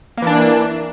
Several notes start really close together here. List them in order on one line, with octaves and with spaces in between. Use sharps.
A#3 E3 D4